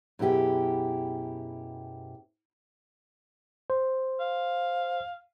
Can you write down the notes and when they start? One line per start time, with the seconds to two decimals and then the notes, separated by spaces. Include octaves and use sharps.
0.19 F#2 B2 E4 G4 G#4
3.70 C5
4.20 F5